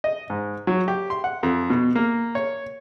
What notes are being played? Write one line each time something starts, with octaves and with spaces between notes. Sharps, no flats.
D#5
G#2
F#3
G4
C6
F#5
F2
B2
A#3
C#5